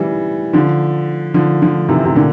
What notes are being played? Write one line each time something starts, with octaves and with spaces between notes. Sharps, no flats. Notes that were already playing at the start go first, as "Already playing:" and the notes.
Already playing: E3 G3
D3 F3
D3 F3
D3 F3
C3 E3
C3
A#2 D3